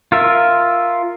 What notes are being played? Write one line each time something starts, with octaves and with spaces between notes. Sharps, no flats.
F4 A#4 E5